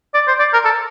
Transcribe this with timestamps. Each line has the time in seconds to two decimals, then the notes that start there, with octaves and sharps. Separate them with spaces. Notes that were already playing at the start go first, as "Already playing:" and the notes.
0.14 D5
0.28 C5
0.39 D5
0.53 A#4
0.65 A4